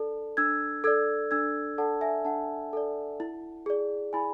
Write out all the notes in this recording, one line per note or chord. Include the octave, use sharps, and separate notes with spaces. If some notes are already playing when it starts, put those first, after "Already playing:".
Already playing: D4 A4 D5 A5
D4 E6 G#6
A4 D5 E6 G#6
D4 E6 G#6
A4 D5 F#5 A5
E5 G#5
D4 F#5 A5
A4 D5
E4
G#4 D5
E4 G#5 B5